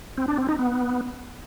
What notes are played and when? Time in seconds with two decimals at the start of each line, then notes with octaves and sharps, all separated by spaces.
0.18 C4
0.28 D4
0.38 C4
0.49 D#4
0.59 B3